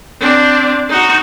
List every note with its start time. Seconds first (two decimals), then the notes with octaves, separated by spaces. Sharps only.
0.21 C4 D4
0.89 D#4 F#4